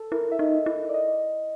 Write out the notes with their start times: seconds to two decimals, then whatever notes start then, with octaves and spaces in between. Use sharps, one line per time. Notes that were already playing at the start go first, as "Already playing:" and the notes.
Already playing: A4
0.12 E4 A#4
0.32 E5
0.39 D#4 D#5
0.66 E4
0.89 D5
0.94 D#5